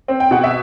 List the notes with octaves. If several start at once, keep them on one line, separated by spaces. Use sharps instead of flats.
C4
G5
B2 F#5
E5